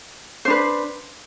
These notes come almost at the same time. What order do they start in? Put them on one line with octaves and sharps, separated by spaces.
C5 D4 B4